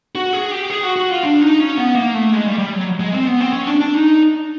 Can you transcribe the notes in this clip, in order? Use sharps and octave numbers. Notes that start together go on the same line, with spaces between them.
F#4
G#4
G4
G#4
F#4
F#4
F4
D4
D#4
C#4
B3
A#3
A3
G#3
G3
G3
F#3
G#3
C4
B3
C4
C#4
D4
D4
D#4